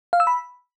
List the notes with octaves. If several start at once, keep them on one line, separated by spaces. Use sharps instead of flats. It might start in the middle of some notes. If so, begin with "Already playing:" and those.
F5
E6
B5